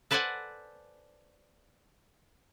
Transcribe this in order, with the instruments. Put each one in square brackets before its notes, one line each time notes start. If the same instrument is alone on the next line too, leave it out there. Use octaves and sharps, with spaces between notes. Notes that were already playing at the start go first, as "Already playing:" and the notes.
[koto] A4 B4 C5 D5 F#5 G#5